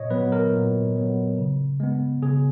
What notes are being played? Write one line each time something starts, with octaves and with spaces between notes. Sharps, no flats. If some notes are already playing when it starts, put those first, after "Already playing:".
Already playing: A#2 C#5 D#5
F#3 B3 B4
A#4
A#2
F#3 B3
C#3
G#3 B3
C#3 G#4